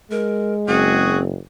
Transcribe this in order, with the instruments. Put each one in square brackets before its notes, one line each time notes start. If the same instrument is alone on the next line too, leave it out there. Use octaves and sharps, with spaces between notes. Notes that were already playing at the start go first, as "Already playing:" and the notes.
[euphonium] G#3 [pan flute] A#4
[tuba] F#1 [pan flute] C4 [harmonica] F#4 G#4